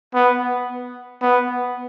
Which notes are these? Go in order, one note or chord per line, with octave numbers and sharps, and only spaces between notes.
B3
B3